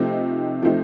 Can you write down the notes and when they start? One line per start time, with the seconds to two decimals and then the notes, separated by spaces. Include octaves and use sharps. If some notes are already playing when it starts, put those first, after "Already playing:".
Already playing: C3 F3 A3 C4 D#4
0.62 C3 F3 A3 C4 D#4